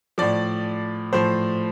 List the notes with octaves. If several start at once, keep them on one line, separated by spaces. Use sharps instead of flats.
A2 F3 D5
A2 F3 C5